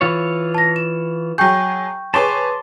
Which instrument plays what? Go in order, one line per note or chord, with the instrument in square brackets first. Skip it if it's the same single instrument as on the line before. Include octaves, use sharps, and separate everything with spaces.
[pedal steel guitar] E3 F4 C#5
[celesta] A5 A#6
E7
[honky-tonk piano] F#3 G#4 [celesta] G5 C#6 G6
[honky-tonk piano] G#4 B4 C#5 [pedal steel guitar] A5 C6 D6